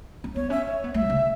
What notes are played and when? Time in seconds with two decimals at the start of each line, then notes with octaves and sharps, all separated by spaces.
0.24 C#4
0.36 B3 C#5
0.50 C#4 E5
0.66 C#5
0.84 B3
0.94 A3 E5
1.06 B2
1.10 C#3